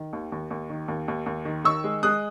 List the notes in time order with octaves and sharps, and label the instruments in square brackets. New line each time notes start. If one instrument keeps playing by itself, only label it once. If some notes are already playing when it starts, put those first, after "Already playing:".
Already playing: [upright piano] D#3
D#2
D#2
D#2
D#3
D#2
D#2
D#2
D#3
D#3 C#6 E6
G#3
G#3 D#6 F#6